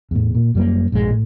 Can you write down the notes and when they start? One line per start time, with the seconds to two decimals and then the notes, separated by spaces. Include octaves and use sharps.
0.11 E2 A2
0.35 A#2
0.55 F#2 G3 G#3 A#3
0.92 A#1 G2 E3 G#3
1.10 A2